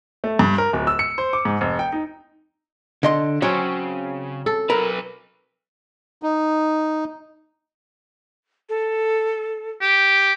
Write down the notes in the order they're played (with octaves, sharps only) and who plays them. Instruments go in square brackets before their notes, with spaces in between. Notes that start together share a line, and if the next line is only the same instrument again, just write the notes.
[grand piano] A3
G2
A#4
D1
E6
C#7
C5
D6
G#2
F1
G5
D#4
[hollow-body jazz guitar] D3 D#5 C6
[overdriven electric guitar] C#3 [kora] F#3 C4 C#4 [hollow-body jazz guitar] C#5
[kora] A4
[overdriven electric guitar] F#3 B4 [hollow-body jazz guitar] A#4
[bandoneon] D#4
[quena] A4
[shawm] G4